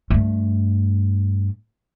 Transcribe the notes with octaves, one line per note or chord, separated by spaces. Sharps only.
G2 A3